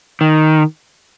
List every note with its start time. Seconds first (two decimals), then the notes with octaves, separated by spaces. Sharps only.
0.21 D#3